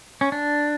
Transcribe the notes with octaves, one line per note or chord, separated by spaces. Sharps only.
C#4
D4